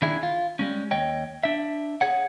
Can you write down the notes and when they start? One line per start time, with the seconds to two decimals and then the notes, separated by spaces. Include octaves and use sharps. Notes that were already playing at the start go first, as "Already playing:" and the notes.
0.02 D#3 D4 E4 G#4
0.23 F4
0.59 G3 G#3 C#4
0.91 D#2 C#5 D#5 G5
1.43 D4 E5
2.01 G#4 C#5 F#5